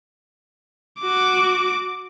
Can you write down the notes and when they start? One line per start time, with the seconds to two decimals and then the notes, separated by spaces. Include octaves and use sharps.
1.01 F#4 D6